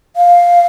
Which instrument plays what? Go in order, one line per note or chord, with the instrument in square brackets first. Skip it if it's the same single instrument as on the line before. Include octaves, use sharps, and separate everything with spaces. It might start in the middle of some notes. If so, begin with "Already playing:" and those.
[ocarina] F5